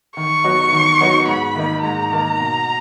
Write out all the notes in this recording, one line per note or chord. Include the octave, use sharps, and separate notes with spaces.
D#3 C#6
F#3 B3 D#4 F#4
D#3
F#3 B3 D#4 F#4
G#2 B5
D#3 A#3 D#4
G#2 A#5
D#3 A#3 D#4
B2